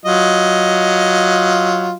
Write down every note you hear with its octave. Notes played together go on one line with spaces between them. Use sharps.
F#3 F4 D#5